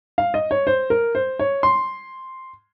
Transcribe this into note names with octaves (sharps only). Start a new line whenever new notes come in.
F5
D#5
C#5
C5
A#4
C5
C#5
C6